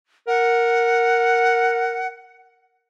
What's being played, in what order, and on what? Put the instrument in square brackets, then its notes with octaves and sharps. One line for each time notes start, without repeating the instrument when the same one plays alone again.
[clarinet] A#4 [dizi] F#5